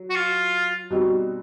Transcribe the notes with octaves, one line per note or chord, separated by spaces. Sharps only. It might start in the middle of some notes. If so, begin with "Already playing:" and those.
Already playing: F#3
F#4
F4
B2 G3 C4 D#4 F#4